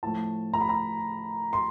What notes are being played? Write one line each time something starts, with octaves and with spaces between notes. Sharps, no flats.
A2 F3 A3 A5
A#5
B5
A#5
C6